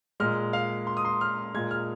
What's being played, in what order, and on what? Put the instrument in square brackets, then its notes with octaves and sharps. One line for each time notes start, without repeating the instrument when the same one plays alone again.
[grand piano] A#2 G#3 F6
F5
C6
D#6
C6
F6
A#2 G#3 G#6
F6